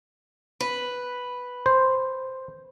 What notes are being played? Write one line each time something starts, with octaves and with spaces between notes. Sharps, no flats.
B4
C5